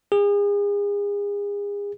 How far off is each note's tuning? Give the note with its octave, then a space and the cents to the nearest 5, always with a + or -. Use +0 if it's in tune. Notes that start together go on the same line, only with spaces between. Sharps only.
G#4 -35